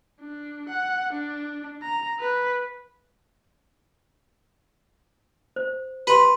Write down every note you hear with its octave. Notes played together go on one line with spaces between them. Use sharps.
D4
F#5
D4
A#5
B4
C5
G4 B4 C6